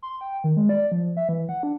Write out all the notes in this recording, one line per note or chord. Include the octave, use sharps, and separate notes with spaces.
C6
G5
D#3
G#3
D5
F3
E5
E3
F#5
D4